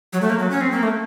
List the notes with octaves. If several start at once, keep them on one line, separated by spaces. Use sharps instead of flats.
F#3
A3
A#3
F#3
C#4
C4
A#3
A3